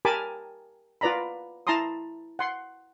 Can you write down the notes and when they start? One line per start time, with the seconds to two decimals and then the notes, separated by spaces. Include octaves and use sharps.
0.05 G4 A#4 G#5 A5 B5 D6
1.01 F4 B4 D5 A#5 B5
1.67 E4 A5 A#5 C6 D#6
2.39 F#5 C6